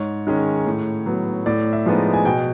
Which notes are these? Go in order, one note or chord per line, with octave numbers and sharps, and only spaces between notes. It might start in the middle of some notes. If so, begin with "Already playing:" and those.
Already playing: G#2 C#5
D#3 G#3 C#4
A2
F#3 B3
A2 D5
E5
F3 G#3 B3 D#4
G#5
B2 G5